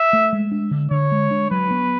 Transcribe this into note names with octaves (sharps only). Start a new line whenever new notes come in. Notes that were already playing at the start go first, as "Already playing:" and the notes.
Already playing: E5
A3
G#3
D4
D3
D3 C#5
G#3
D4
F#3 B4
B3